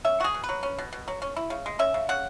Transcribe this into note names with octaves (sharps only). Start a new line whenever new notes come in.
C#4 E5
B2 F#4 G#4
B2
B4
F#3
C#4
B2
B2
F#3
C#4
E4
C#3
G#3
C#4 E5
C#3
C#3 F#5